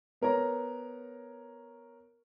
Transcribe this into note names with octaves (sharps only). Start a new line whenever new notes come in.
B3 A#4 C#5 A#5